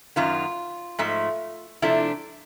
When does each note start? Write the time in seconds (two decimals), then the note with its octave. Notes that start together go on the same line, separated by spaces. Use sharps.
0.16 F#2 D#3 F#3 F4
0.99 G#2 F3 A3
1.82 C3 F3 A3 D4 E4